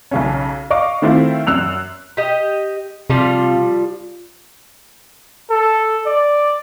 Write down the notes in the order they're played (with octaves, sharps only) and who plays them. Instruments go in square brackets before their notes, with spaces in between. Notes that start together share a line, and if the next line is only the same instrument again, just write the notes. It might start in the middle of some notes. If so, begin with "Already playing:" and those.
[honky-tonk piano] B1 C#3 C#4
D#5 F5 C#6 D6
D#3 A3 C4 E4 F4
F#2 E6 F#6 F7
[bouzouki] G4 D#5
[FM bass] C3 [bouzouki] F3 G3 F4
[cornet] A4
D5